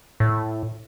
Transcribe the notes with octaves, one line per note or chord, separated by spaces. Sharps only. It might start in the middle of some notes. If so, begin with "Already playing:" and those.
A2